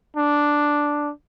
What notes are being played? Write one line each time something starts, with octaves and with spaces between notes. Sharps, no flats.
D4